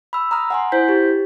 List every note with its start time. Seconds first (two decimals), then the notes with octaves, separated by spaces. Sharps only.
0.13 B5 E6
0.31 A#5 D#6 F6
0.50 F#5 G#5 C6
0.72 E4 C5 G6 B6
0.89 G4